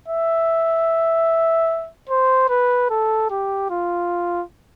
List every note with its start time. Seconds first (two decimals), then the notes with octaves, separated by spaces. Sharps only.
0.08 E5
2.09 C5
2.49 B4
2.90 A4
3.30 G4
3.70 F4